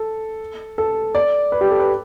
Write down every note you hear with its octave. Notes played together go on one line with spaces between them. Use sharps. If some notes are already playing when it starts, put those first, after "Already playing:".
Already playing: A4
A4
D5
B4
G4
A4
B4